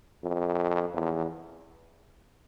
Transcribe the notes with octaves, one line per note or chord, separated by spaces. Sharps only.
F2
E2